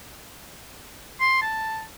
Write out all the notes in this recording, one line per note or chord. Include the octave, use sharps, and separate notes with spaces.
C6
A5